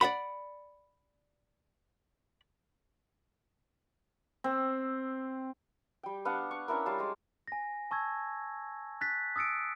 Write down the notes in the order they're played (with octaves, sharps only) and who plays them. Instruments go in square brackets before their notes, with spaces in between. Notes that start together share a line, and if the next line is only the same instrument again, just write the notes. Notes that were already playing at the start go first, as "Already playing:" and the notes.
[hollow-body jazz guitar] D5 E5 F#5 B5
[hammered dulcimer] C4
[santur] G3 G5
B3 D4 F5 F#5
C#6
C#4 D4 E4 A#4
G3 C#4 F5 A5
G#3 D5 A#5
[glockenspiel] G#5 A#6
A5 C#6 E6 G#6
F#6 A6 B6
D#6 E6 A6 C#7 D7